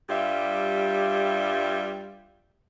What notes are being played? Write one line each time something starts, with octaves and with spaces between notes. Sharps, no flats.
G2 G3 F4 G4 E5